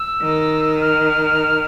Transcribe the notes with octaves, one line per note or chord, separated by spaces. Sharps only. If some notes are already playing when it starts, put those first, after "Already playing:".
Already playing: E6
D#3
F6